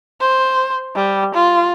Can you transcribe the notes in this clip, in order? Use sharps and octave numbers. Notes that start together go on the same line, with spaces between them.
C5
G3
F4